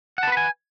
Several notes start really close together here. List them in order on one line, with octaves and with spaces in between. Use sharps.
F#5 A5 B4 B5 G#5